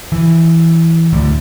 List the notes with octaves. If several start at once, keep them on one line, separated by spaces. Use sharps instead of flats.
E3
D2 A2